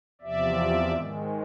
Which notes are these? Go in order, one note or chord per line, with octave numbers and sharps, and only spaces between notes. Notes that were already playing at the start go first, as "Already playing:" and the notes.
E2 C3 F3 D5 E5
G#2 D#3 G#3